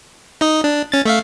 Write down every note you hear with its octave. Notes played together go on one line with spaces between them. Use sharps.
D#4 D#5
D4
C#4 A6
A3 E5 F5